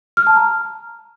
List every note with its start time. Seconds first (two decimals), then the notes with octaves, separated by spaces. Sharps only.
0.17 F6
0.27 A5
0.36 A#5